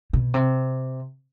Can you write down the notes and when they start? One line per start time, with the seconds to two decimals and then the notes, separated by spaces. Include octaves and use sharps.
0.13 B2
0.34 C3